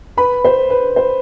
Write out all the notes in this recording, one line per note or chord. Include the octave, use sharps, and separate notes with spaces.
B4 B5
C5
B4
C5